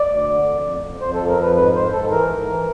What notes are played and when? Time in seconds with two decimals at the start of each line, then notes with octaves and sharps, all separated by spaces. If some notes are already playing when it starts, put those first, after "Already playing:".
Already playing: D5
0.10 D2
0.28 D3
0.47 F2
0.65 F2
0.83 F2
1.01 F2 C5
1.15 A4
1.20 F3
1.29 A#4
1.38 F2 B4
1.56 G#2 B4
1.75 G#2 C5
1.93 G#2 A4
2.11 E3 A#4
2.29 G#2
2.48 E3